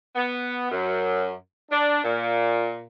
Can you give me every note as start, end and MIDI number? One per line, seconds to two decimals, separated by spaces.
0.16 0.68 59
0.71 1.32 42
1.71 1.99 62
2.04 2.83 46